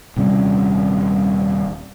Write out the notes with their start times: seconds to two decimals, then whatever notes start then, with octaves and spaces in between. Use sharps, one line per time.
0.16 D#1 C3 G3 C#4